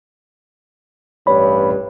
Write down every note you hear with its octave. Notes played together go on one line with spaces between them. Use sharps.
A1 G2 C#5 B5